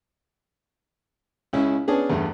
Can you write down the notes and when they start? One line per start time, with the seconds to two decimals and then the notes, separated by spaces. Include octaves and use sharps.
1.53 C#2 C#3 C#4 E4
1.88 B3 C#4 D4 G#4
2.10 E2 G2 A3